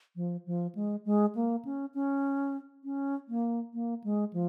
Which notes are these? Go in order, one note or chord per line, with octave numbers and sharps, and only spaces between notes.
F3
F3
G#3
G#3
A#3
C#4
C#4
C#4
A#3
A#3
G#3
F3